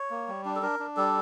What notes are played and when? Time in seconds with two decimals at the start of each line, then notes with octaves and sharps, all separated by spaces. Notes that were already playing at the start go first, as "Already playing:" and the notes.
Already playing: C#5
0.10 A#3
0.28 G3
0.45 D4
0.56 A4
0.62 D4 A#4
0.79 D4
0.97 G3 A4